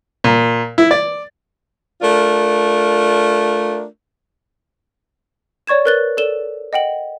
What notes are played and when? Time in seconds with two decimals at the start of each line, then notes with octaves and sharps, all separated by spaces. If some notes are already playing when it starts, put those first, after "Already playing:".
0.24 A#2
0.78 E4
0.91 D5
2.02 A3 D4 F4 A#4
5.67 C#5 D5 C#6 G#6 E7
5.85 A#4 B4 F#6 A6 G7
6.17 A4 D5 E7 G7
6.73 D#5 F#5 G5 F#7